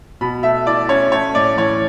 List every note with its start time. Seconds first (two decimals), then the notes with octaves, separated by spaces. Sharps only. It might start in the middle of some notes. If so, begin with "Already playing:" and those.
0.21 B2 B5
0.43 A3 E5
0.66 E4 D5
0.89 C#4 C#5
1.12 A3 C#5
1.35 A2 D5
1.57 E3 C#5